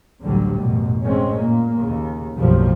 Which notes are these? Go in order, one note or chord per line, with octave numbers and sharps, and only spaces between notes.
A1 D2 D3 F#3 G3
A1 F#2 B2
A1 G#3 C4 C#4
A#2 A#3
D#2 C#3
F#1 B1 F#2 A2 F3 G3